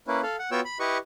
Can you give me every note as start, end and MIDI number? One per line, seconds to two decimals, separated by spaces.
0.08 0.21 58
0.08 0.21 61
0.08 0.21 64
0.08 0.21 71
0.23 0.36 69
0.23 0.36 77
0.39 0.50 78
0.52 0.60 59
0.52 0.60 65
0.52 0.60 66
0.52 0.60 73
0.52 0.60 79
0.52 0.60 88
0.65 0.78 83
0.80 0.98 64
0.80 0.98 67
0.80 0.98 71
0.80 0.98 75
0.80 0.98 85